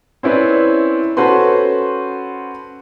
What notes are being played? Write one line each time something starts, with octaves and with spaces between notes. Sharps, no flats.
C4 C#4 E4 B4 D5
C#4 F#4 A4 B4 C5 C6